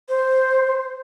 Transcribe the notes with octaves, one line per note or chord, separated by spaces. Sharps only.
C5